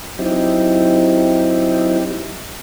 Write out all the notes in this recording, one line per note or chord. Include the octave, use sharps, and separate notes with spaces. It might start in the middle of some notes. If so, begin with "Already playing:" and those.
F#3 C4 D#4 E4 G4